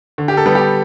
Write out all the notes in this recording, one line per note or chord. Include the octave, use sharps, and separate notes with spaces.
D3
G4
A4
G3 B3
G4